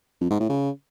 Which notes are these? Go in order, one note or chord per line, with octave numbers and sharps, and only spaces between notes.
F2
G#2
A2
C#3